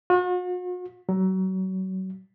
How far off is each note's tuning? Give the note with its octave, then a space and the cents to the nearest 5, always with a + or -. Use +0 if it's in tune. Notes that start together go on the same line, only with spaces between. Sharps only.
F#4 -45
F#3 +30